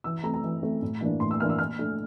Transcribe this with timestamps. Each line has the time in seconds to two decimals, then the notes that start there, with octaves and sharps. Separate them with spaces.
0.04 E3 E6
0.23 A3 C4 A#5
0.34 A#5
0.44 E3
0.63 A3 C4
0.82 A2
1.01 E3 A#3 D4
1.20 A2 C6
1.31 E6
1.40 E3 A#3 D4 F6
1.50 E6
1.58 A#2 F6
1.79 A3 D4